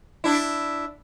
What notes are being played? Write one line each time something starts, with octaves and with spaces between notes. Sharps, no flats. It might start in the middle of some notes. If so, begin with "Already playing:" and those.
D4 E4